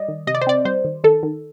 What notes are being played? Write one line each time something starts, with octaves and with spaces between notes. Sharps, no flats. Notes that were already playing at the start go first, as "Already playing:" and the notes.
Already playing: G3 D5 D#5
D#3
C3 D#5
D5
C5
C4 D5
G3 C5
D#3
D#3 A4
D#3